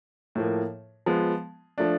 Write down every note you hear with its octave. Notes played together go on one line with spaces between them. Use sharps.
A2 F3 A#3
F3 G#3 B3
F3 A3 D4